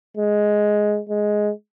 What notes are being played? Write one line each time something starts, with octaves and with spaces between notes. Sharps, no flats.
G#3
G#3